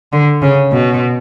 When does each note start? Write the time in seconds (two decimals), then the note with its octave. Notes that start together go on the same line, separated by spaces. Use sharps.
0.13 D3
0.42 C#3
0.72 B2